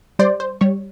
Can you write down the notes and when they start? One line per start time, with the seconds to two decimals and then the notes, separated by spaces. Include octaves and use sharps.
0.19 G3 C5 D5
0.40 C5
0.61 G3 C#5